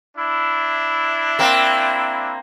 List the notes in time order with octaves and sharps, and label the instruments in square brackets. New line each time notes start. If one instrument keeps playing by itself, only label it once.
[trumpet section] D4 E4
[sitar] A#3 C4